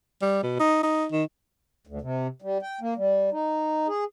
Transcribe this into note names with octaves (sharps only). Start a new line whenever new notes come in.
G3
B2
D#4
D#4
D#3
D2
C3
G3
G5
A#3
G3
D#4
G#4